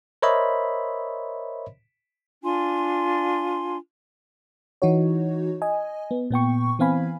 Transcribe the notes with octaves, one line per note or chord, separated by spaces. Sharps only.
A#4 C5 C#5 D#5 E5 B5
D4 F4 G#5 C6
E3 D#4 F#4 C#5
D#5 G#5
B3
A#2 B3 G5 C#6
E3 B3 C4 F5 G#5 B5